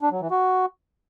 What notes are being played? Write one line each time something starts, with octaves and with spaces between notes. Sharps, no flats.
D4
F#3
E3
F#4